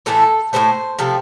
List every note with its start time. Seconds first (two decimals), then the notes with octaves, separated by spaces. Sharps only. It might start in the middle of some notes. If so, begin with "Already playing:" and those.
0.06 A2 E3 A3 A4
0.53 A2 F#3 A3 C5
0.99 C3 F3 A3